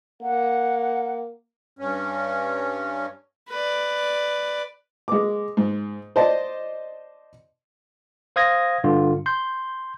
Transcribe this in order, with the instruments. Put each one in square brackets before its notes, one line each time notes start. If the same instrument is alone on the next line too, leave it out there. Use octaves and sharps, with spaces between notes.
[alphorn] A#3 [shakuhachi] F#5
[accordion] G2 C#4
[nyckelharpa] B4 D5
[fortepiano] G#3 D6
G#2
C5 D5 D#5 A5
[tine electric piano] C5 F5 D#6 G#6 A#6
G2 D3 F4
C6 G6